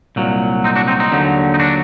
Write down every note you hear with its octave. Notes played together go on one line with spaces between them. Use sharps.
C2 A#2 F#3
C4 D#4
D4 F#4
C4 D#4
C4 D#4
D#2 D3 F#3
D#4
D4 F#4